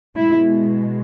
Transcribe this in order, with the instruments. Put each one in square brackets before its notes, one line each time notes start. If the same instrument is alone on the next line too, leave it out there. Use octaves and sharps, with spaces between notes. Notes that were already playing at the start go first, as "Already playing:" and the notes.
[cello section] B2 G#3 E4